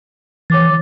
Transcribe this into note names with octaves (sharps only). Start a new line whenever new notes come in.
E3 C#5 D6 A6